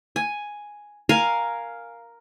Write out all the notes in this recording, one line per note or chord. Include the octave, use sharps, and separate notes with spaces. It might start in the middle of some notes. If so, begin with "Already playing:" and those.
G#5
A#4 F5 G#5